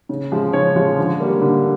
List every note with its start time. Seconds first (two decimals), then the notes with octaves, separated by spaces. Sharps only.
0.09 C#3
0.32 F3 G#3
0.53 C#3 C#5
0.76 F3 G#3
0.98 D3
1.20 G3 A#3
1.42 D3